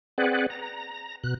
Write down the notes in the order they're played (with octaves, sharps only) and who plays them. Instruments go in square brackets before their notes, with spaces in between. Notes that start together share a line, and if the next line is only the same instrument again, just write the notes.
[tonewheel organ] C4 G#4 B4 D5 F#5
A#5
B2 F#6